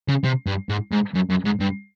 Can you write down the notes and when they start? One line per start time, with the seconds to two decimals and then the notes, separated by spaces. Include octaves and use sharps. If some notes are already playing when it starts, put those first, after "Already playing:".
0.08 C#3
0.24 C3
0.46 G2
0.69 G#2
0.92 G#2
1.15 F#2
1.30 F#2
1.45 G#2
1.60 G2